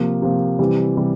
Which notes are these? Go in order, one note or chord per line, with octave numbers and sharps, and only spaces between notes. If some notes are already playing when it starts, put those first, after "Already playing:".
Already playing: C3 F3 A#3
C3 F3 A#3
C3 E3 G3
C3 E3 G3